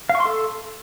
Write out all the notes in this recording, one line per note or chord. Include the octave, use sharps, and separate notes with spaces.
F5
C#6
C6
A4